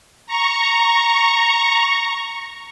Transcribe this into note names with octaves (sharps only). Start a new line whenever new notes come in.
A#5 C#6